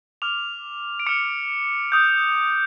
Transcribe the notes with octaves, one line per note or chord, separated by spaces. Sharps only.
D6 F6 F7
D7
D6 F6 C#7
D#6 G6